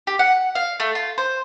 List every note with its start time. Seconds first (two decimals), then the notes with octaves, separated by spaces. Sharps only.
0.07 G4
0.19 F#5
0.55 F5
0.80 A3
0.95 F4
1.18 C5